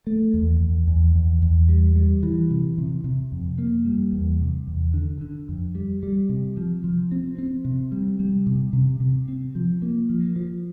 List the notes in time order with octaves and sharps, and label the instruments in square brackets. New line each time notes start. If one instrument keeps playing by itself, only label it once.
[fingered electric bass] A3
E2
E2
E2
E2
E2
G3
G3
E3
C3
C3
C3
F2
A#3
G3
E2
C3
E2
D3
D3
F2
G3
G3
C3
F3
F3
C4
C4
C3
G3
G3
C3
C3
C3
C4
F3
A#3
F3
F3